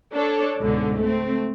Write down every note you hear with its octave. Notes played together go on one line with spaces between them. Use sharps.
D4 A4 C#5
C#2 G#2 B2 D3
A3 C4